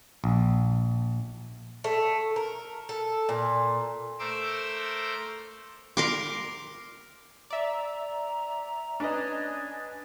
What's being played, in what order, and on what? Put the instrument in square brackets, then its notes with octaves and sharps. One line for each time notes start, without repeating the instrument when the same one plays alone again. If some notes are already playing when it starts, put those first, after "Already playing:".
[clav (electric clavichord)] A#1
[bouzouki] A3
A#4
A4
A#2
[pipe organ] A3 A#4 C5 C6 D6 E6
[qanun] A#4 C6 D6
[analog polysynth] D5 E5 [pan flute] A#5
[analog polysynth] C#4 [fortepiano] D4 B4 D#5 [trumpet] G#5